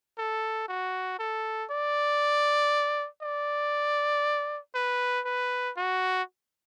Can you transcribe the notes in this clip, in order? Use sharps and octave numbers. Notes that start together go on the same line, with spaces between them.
A4
F#4
A4
D5
D5
B4
B4
F#4